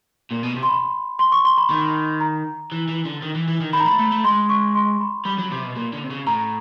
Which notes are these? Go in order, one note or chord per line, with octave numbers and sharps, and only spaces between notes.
A#2
B2
C3
C6
B5
C6
C#6
C6
B5
D#3
A#5
E3
E3
D3
D#3
E3
E3
D#3
D#3 B5
A#5
A3 B5
A3
A3
G#3 C6
C#6
C6
B5
G3 B5
F#3
C3
B2
A#2
D3
C3
C#3
A2 A#5